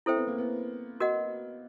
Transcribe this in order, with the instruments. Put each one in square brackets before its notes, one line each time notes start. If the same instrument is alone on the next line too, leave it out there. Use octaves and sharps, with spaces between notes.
[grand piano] C4 [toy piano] E4 A4 C5 E5 G5
[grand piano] B3
A#3
B3
[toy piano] F#4 A#4 D#5 F#5